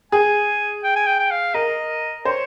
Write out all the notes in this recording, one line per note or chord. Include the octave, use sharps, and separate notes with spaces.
G#4 G#5
G5
G#5
G5
G5
F5
A#4 D#5
C5 C#5